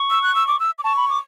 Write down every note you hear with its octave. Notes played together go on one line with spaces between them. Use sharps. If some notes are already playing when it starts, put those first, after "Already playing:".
Already playing: C#6
E6
F#6
E6
D6
E6
D6
A5 C#6
B5
D6